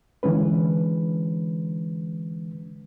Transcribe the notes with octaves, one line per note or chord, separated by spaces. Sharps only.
D3 E3 G#3 C#4 B4